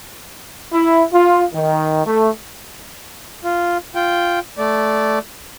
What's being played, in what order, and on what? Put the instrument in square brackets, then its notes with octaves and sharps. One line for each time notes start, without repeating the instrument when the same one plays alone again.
[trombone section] E4
F4
D#3
A3
[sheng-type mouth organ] F4
F4 G5
A3 D5